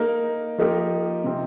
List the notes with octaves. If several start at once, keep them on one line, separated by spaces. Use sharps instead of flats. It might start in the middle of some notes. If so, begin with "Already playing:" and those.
Already playing: A#3 D#4 A#4
F3 A#3 D#4 G4 A#4
C3 F3 C4